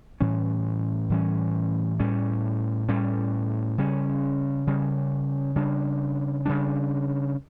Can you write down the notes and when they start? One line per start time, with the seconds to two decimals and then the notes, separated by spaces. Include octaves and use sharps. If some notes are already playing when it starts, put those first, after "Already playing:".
0.20 A2 E3 G3 C#4
1.10 A2 E3 G3 C#4
2.00 A2 G3 C#4
2.88 A2 G3 C#4
3.78 C#3 G3 C#4
4.67 C#3 G3 C#4
5.56 C#3 G3 D4
6.45 C#3 G3 D4